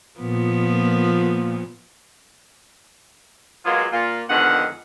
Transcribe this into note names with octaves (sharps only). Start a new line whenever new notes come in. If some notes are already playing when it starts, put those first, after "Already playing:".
A#2 F3 B3
F#3 G#3 A#3 B3 F4
A#2 F4
F2 D3 D#3 G#3 B3 F#5